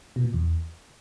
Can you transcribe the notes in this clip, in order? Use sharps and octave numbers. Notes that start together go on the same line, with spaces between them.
B2
A#2
E2